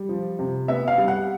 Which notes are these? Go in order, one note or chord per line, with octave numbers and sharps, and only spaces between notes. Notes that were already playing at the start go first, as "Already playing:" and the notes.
Already playing: G3
F3
C3
B3 E5
F5
G3
F#5